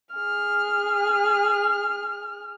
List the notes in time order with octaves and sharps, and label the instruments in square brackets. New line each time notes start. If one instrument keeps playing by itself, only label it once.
[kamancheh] G#4 F6